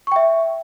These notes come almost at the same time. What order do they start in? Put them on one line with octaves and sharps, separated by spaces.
C#6 G5 E5